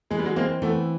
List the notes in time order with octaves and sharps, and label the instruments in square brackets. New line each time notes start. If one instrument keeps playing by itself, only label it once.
[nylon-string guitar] E3 [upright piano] G#3
[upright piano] G3
F#3 G#3
[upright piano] G#3 A#3 [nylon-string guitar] C4
[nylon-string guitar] E3 [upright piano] A3 B3